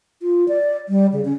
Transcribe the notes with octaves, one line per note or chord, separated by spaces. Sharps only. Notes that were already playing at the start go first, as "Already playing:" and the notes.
F4
D5
G3
C#3
C#4